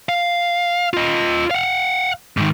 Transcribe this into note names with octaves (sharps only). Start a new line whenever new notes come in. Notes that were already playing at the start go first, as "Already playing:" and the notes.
F5
F4 D#5
F5 F#5
G#2 D#3